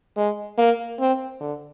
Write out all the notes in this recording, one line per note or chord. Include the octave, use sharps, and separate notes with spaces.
G#3
A#3
C4
D3